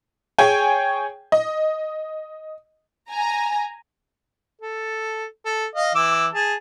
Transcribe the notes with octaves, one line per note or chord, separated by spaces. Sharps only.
G#4 C#5 G5 G#5
D#5
G#5 A#5
A4
A4
D#5 F5
E3 D6 E6
G#4 A5